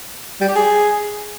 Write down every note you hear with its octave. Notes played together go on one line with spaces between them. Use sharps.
G3
G4
G#4